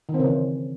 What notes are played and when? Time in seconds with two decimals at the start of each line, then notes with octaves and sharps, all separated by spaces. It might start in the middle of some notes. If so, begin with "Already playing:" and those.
0.09 D#3
0.14 C4
0.20 C#3
0.25 E3